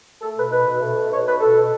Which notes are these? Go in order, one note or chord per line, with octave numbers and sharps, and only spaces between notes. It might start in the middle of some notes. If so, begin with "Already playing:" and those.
A3 A4
B2 B4
D#4 B4
B2
A3
B2
D#4 C#5
B2 B4
B2 A4